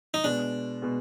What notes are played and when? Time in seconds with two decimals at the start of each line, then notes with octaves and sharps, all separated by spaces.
0.14 D#4
0.24 B2 G#3 B3 D4
0.82 B2 G#3 B3